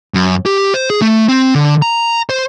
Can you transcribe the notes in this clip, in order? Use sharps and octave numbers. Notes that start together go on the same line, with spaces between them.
F#2
G4
C5
G#4
A3
C4
D3
A#5
C5